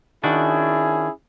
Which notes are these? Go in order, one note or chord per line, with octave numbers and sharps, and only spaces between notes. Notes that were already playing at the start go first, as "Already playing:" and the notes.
D#3 C#4 D4 E4 F#4 G#4